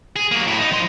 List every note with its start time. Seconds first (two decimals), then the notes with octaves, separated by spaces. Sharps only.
0.16 G#4
0.31 F#3 A#3
0.47 A2 E4
0.58 D#4
0.72 F3 C6